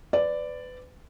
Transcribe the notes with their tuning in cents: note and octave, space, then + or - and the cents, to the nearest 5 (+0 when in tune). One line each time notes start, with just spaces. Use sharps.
B4 +30 D5 +0